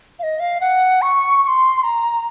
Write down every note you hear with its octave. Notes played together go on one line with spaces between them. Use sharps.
F5
D#5
F5
F#5
C#6
C#6
C6
A#5